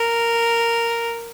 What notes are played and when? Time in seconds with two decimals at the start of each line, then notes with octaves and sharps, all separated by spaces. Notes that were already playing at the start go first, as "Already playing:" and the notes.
Already playing: A#4